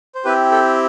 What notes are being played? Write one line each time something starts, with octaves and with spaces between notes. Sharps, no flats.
C5
C4 E4 G4 B4
A4